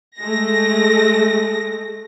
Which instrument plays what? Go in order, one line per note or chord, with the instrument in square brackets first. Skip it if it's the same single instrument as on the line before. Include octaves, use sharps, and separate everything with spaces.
[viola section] G#3 A3 [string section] A#6